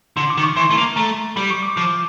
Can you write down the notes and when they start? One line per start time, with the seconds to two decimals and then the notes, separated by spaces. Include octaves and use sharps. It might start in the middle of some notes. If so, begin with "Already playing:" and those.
0.17 D3 C6
0.30 D6
0.37 D#3
0.43 C#6
0.56 E3 C6
0.70 A3
0.77 A#3
0.96 A3 A#5
1.36 G3 B5
1.51 C#6
1.63 D6
1.76 F3 D6